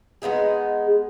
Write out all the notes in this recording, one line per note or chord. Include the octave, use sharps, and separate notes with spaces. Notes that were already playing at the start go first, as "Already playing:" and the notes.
G#3 B3 D#4 G#4